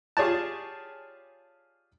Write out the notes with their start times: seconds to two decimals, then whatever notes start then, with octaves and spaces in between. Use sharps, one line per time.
0.17 F4 G4 G#4 C#5 D5 A5